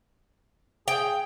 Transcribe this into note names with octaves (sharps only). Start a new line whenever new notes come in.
G#4 G5